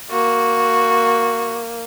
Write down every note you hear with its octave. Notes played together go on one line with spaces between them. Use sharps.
A#3 F#4